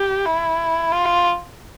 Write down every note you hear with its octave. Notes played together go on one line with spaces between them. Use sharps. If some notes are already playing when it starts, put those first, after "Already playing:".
Already playing: G4
E4
F4